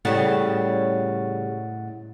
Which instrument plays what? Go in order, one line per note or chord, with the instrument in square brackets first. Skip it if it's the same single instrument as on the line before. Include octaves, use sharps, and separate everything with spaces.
[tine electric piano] A2 F#5 A6 [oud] C#3 G3